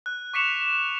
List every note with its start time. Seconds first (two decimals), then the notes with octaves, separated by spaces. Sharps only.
0.06 F#6
0.34 C#6 D6 B6 C#7 E7 F7